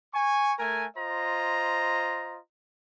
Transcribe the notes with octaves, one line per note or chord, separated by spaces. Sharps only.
G#5 C#6
A3 A#4 G#5
F4 C5 D#5 A#5